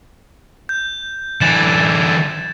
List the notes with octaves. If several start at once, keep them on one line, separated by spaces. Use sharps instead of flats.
G6
D3 E3 G#6 A6 E7